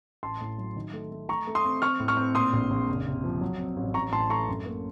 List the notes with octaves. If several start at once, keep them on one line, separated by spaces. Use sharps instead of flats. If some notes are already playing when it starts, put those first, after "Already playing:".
A1 A5 C6
A2
F#3
D#3
A3
A3
A3 A#5 C#6
A3
C6 D#6
C4
C4 C#6 F6
A2
C#6 F6
C4
A#2 C6 D#6
A#1
A#1
F#1
C3
F3
F#3
C4
A1
A1 A#5 C#6
A2 A5 C6
A3 A#5 C#6
F#2
A#3